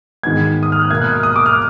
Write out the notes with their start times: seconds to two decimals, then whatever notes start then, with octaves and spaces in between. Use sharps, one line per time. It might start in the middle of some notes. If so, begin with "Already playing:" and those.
0.23 G#2 D#3 G#3 B3 G#6
0.63 D#6
0.72 F6
0.81 F#6
0.91 B2 A#3 G#6
1.01 F#6
1.12 F6
1.23 D#6
1.36 D6
1.46 F6